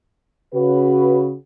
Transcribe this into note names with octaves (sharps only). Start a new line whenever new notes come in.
C#3 F#4 B4